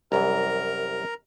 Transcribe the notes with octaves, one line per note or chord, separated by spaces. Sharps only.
C2 F#2 E3 A#4 A#5